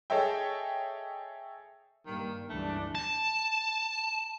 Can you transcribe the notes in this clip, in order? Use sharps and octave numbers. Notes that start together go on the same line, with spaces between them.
G#4 A4 C#5 D#5 E5 G5
G2 D#3 A#3
C#2 G2 E3 A3 D4
A5